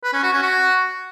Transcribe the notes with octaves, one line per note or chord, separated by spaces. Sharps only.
B4
C#4
F#4
C#4
F#4